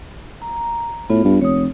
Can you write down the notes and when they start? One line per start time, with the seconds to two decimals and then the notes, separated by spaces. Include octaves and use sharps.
0.42 A#5
1.10 A2 B3 F4
1.25 G2
1.41 F1 C#5 D#6